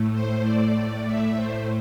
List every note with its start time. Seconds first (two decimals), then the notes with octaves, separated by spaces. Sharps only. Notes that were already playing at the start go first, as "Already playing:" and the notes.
Already playing: A2 A3
0.12 C5
0.43 D5
1.04 E5
1.35 C5